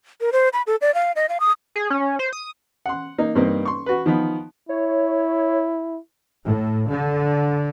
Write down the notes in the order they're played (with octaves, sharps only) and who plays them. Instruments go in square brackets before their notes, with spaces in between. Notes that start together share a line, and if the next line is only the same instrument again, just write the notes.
[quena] A#4
C5
B5
A4
D5
F5
D#5
F5
D#6
[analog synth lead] G#4
C#4
C5
D#6
[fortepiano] F#5 C6
A#3 D#4
G2 A#3 C4 D#4
C6 C#6
F#4 B4
D#3 F3 B3
[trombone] E4 [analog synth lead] C#5
[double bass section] A2
D3